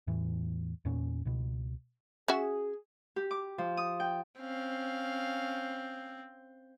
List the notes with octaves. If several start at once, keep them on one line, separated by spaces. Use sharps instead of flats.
E2 A2 E3
E2 A#2 C#4
C#2 B2
C#4 F#4 G#4 E5
G4
D6
F3
D#6
G5
C4 C#4 F5